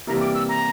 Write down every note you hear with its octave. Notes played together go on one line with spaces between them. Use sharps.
C3 E3 G3 A#3 E4 A#5
D6
E6
A#5